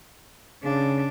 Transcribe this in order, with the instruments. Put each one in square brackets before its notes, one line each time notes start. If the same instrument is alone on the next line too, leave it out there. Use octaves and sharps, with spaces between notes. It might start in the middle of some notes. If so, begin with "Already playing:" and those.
[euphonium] C#3 [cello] D4